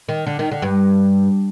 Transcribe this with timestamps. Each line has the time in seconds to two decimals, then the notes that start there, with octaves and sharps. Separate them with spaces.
0.09 D#3
0.27 D3
0.39 D#3
0.51 D3
0.62 G2